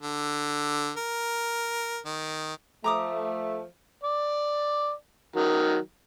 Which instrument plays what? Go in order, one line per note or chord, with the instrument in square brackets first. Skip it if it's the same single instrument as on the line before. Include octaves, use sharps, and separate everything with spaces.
[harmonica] D3
A#4
D#3
[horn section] F3 A3 [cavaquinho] A#5 D6 D#6
[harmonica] D5
D#3 F#3